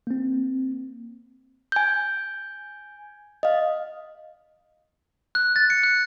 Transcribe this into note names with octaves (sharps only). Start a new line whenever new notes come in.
A#3 C4
G#5 G6
D#5 F5
F#6
A6
C#7
F#6